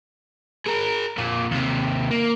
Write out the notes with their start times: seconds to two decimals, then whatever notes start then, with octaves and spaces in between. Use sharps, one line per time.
0.67 G#4 A#4
1.18 F2 A#2
1.51 D#2 C3
2.11 A#3